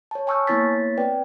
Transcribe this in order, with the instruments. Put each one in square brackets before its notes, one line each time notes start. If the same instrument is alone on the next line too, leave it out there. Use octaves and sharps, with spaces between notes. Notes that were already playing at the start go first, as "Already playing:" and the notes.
[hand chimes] C#5 A5
G#5 A5 C#6 E6 F6 G6
A#3 B3 E4 C#5 A6 B6
C4 B4 D5 G5